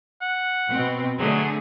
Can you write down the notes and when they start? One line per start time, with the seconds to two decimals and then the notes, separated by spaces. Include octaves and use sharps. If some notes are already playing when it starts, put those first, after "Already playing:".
0.22 F#5
0.71 B2 C4
1.19 D3 F#3 A3 G#4